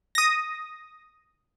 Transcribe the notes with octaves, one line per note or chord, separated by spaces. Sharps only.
D#6 A#6